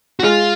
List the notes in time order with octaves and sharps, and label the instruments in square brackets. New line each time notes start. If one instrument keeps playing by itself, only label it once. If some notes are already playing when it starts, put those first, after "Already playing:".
[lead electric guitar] F#4
[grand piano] G#3 [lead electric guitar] F4